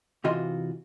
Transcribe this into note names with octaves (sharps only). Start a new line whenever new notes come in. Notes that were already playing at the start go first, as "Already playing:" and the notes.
C3 E3 F4 F#4 D#5 C6